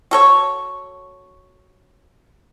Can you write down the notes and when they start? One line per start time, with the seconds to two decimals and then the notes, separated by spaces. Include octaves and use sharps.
0.11 F#4 A4 C#5